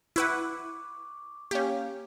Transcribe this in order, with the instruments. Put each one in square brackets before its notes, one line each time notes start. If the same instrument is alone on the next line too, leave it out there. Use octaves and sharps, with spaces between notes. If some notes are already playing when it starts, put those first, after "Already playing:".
[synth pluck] E4 B4 F#5 [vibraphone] C#6 D6
[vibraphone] A#3 F5 [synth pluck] C#4 G4